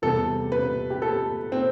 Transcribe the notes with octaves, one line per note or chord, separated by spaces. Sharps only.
E2 C3 G3 A4
B4
G4
A4
C4